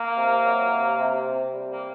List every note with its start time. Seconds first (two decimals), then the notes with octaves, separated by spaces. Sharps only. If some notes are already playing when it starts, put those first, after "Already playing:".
Already playing: A#3
0.15 C3
0.42 F#3
0.70 C3
0.98 C3
1.25 C3
1.54 G3
1.69 A#3